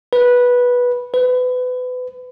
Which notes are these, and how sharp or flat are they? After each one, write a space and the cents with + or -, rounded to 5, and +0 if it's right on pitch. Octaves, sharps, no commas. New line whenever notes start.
B4 -10
B4 +30